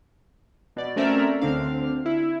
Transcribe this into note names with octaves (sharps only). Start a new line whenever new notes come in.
B2 D5
A3 C4 C#4 A#4 D5 E5
D2 D3 C4 D4 F5
E4